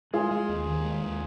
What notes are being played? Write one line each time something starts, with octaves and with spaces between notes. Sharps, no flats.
G#3 F4 G#4
G#3
D#2
D#3
G#3
D#2